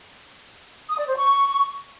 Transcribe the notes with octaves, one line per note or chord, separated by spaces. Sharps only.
D#6
D5
C5
C#6